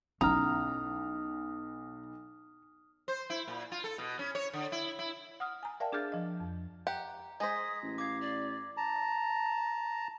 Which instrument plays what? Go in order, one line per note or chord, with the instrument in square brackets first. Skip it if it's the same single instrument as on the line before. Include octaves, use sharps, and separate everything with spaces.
[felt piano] B1 [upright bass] C#4 E4 [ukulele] A#5 [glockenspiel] D#6 F6
[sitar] C5
E4
A#2
F4
A4
B2
C#4
C#5
D3
E4
E4
[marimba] F#5 D#6 F6
G#5 A#5
A#4 D5 E5 F5 G5 A5
D4 G#4 D6 F6 G6 A6
F3 D#5
F2
[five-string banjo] G4 F#5 [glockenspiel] A#5
[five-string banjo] G#3 C5 [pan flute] D#6 [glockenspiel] G#6 A#6 B6
[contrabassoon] A1
[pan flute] F5 [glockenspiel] D6 G#6
[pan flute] D5
[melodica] A5 A#5